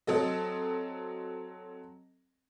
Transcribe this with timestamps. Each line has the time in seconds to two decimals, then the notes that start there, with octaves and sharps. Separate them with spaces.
0.07 F#3 C4 A4 D#5